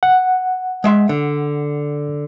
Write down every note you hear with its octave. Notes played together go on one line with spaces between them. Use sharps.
F#5
G#3 E5 C6
D3